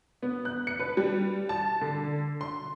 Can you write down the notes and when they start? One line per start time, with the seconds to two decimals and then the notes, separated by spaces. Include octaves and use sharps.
0.23 B3
0.45 F#6
0.67 C#7
0.79 B4
0.97 G3
1.49 A5
1.81 D3
2.41 C6